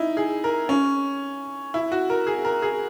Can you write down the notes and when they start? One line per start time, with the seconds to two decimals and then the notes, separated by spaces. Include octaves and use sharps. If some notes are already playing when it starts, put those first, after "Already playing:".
Already playing: D#4 E4
0.17 G#4
0.44 A#4
0.69 C#4
1.74 E4
1.92 F#4
2.10 A#4
2.27 G#4
2.45 A#4
2.62 G#4